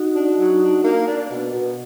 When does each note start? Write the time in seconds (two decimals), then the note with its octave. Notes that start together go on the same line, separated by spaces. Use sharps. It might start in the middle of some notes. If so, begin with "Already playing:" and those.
Already playing: D#4 F#4
0.16 D4
0.39 F#3
0.62 D4
0.85 A#3
1.08 D4
1.30 B2
1.53 B2